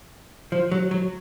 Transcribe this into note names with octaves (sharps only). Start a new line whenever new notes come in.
F3
F#3
F#3